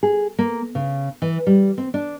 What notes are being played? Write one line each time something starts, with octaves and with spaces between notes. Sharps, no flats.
G#4
A#3
C#3
E3
G3
C4
D4